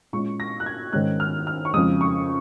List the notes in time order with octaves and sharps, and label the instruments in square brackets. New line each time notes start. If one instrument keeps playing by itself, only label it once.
[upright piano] A#2 G#3 C#4 C#6
A#6
F#6
G#6
G#2 D#3 G#3 C#4 F#6
F6
F6
C#6
F2 C#3 G#3 D#6
C#6